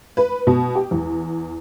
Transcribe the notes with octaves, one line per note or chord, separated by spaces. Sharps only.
B4
B2
G4
E2